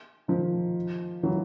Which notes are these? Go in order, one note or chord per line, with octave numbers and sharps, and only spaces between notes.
D#3 F3
E3 F#3